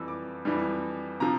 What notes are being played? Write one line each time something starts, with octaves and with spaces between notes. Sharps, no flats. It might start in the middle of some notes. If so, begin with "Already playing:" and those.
Already playing: F2 E3 G3 E6
D6
F2 E3 G3
C3 F3 A#5